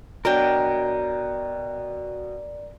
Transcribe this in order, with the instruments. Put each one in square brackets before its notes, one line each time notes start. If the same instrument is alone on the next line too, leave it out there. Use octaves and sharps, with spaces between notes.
[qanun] B2 F#3 D4 [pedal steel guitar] A#4 G5 [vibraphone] D5